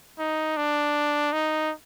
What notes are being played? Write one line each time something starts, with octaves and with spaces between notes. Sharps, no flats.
D#4
D4
D#4